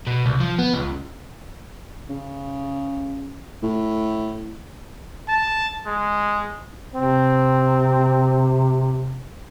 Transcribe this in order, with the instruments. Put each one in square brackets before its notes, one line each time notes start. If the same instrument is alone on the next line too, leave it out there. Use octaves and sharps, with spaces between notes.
[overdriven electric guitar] B2
C2
F3
B3
C#2
[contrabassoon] C#3
A2
[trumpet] A5
G#3
[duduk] C3 [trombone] C4